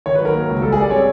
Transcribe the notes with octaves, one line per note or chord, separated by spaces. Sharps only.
D#3 C#5
B4
F#3 A#4
A#3
C#2
G3 A4
G#4
G3 D5
C4 C#5